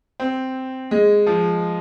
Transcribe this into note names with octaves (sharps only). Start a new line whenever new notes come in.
C4
G#3
F3